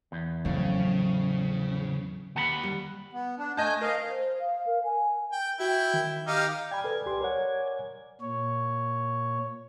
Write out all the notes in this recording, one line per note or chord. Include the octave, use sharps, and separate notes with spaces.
E2
F2 A2 C#3 F#3
D#2 F#5 A5 B5
G3
B3
D4
A3 D#5 G#5 A5 G6
A#4 D#5 F5
C5
F5
A#4
G#5
G5
E4 F#4 G5
D#3
D#4 G4 F5
D5 G5 G#5 B5 G#6
A4 B4
C2 G4 C6
A#4 C#5 F#5
A#2 C#5